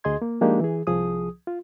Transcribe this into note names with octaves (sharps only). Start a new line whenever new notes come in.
D2 G#4 D#5 C6 G#6
A#3
F3 G#3 A#3 D4 D#4 G4
E3 G#4
C2 F3 G#4 D#6
F4